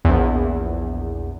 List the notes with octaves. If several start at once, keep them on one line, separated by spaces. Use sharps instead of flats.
A#1 E2